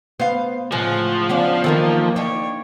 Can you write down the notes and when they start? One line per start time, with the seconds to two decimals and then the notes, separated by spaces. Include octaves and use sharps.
0.20 B3 C5 F5
0.72 A2 C#3 F3 G#3 F#5
1.29 B3 C#4 D4 F5
1.64 D#3 E3 A#3 D#4 A4 A#4
2.16 D4 D#4 C#5 G5